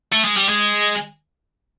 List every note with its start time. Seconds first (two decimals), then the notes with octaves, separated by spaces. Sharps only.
0.12 A3
0.24 G#3
0.37 G3
0.49 G#3